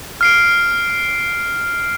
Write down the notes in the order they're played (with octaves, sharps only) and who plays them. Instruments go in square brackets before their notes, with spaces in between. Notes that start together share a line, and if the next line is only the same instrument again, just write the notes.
[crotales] F6 C7 D7